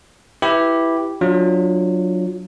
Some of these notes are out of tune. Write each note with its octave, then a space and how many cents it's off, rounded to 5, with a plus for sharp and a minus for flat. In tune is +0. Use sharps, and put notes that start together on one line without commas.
E4 +0 G4 +0 B4 +0
F#3 -15 D4 +0 F4 +0